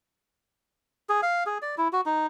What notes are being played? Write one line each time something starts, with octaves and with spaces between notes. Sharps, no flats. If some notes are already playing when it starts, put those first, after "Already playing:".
G#4
F5
G#4
D5
E4
F#4
D#4